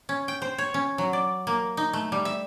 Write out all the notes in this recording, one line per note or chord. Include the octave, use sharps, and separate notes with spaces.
C#4
G5
C5
C#5
C#4
F#3
D5
A#3
D#4
A3
G3
E5